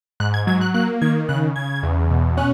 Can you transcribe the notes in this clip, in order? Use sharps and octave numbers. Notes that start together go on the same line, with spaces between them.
G#2 F#6
G#6
F#3 G#6
F#6
A#3 F#6
D#3 G#6
C#3 F#6
C#3 G#6
E2
B2
C#4 F#6